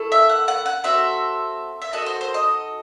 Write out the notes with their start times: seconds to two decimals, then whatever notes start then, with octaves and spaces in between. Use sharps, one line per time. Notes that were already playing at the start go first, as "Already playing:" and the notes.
Already playing: A3 E4 A4
0.12 E5
0.29 F#5
0.48 F#5
0.66 F#5
0.84 C4 F#4 A4 E5
1.82 E5
1.93 D#4 F#4 A4 D#5
2.06 C5
2.21 C5
2.34 D#5